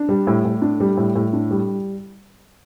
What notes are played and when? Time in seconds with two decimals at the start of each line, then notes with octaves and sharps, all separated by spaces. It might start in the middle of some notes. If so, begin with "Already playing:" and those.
Already playing: D4
0.09 G3
0.27 A2
0.45 A2
0.62 D4
0.80 G3
0.97 A2
1.15 A2
1.33 D4
1.51 G3